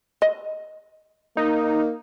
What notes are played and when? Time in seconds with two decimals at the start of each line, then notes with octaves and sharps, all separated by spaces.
0.22 D#5
1.37 A#3 D#4